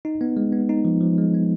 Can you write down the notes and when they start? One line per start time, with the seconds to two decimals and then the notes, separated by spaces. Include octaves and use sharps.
0.05 D#4
0.21 B3
0.37 G#3
0.53 B3
0.69 D#4
0.85 F3
1.01 F3
1.18 G#3
1.34 B3